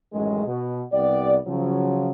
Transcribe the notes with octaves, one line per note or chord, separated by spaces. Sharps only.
A1 F#2 D#3 G#3
B2
C2 B3 G4 D5
C#3 F3 F#3